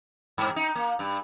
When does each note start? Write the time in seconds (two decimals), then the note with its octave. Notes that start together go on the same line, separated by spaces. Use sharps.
0.38 G2
0.56 D#4
0.75 A#3
0.99 G2